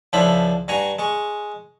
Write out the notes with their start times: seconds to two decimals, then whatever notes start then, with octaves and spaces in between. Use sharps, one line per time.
0.13 C#2 F3 D4 E4 C5 B5
0.68 G2 F#4 G#5 A#5 C#6
0.99 G#3 C#6